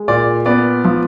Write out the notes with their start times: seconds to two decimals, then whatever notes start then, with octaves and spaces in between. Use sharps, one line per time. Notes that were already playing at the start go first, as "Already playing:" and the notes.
Already playing: G#3
0.08 A#2 D5
0.46 B3 D5
0.85 F3